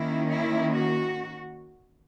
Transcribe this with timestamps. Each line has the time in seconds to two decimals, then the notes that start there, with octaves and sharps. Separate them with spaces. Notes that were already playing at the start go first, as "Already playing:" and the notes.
Already playing: D#3 A#3 C#4 E4
0.30 E4
0.71 F#4